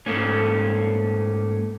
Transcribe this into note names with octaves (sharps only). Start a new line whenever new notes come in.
G#2 A3 A#3 C#4